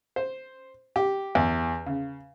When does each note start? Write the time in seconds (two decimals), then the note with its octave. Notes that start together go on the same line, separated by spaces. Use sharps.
0.16 C5
0.96 G4
1.35 E2
1.86 C#3